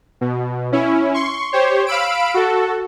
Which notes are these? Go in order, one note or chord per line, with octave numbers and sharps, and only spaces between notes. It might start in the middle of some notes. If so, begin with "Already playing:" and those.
B2
C#4 E4
C6 C#6
G4 C5 C#5
F5 B5 E6 D7
F#4 A4